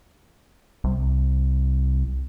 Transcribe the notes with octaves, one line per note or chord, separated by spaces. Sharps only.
C2